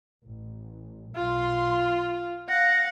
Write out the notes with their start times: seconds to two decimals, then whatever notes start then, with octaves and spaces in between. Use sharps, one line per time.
0.26 A1
1.16 B1 F4 C6
2.49 F5 F#5 A#6